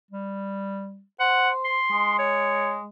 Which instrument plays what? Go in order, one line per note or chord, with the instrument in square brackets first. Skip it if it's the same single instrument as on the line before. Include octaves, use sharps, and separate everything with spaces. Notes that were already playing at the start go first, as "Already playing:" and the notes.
[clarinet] G3
[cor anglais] C5 [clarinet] F#5
[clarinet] C6
[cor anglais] G#3
[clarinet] C#5